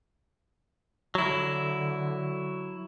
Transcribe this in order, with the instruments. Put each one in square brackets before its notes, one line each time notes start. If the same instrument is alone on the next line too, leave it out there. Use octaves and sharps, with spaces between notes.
[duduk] D3 [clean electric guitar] F#3 E4